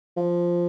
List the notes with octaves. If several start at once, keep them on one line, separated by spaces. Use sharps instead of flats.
F3